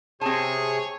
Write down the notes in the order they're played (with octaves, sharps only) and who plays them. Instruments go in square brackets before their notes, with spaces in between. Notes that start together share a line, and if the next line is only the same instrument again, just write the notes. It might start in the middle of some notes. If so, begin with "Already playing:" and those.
[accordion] C3 G#4 G#5 [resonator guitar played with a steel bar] C4 A5 [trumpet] C#5